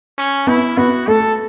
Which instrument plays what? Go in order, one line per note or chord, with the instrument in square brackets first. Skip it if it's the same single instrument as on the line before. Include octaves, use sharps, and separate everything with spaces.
[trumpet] C#4
[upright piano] B3 [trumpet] E4
[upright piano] B3 [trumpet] F#4
[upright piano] A3 [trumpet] A4